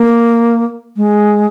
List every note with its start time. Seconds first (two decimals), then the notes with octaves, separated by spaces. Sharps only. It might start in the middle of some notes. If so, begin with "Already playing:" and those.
Already playing: A#3
0.97 G#3